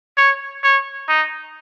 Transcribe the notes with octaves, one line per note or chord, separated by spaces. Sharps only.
C#5
C#5
D#4